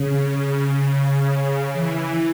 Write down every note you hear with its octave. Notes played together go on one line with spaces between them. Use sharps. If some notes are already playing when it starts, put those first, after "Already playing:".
Already playing: C#3
E3